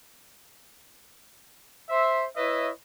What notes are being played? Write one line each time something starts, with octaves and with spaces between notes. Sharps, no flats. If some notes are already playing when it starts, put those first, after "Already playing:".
C5 E5
E4 B4 C#5 D#5 E5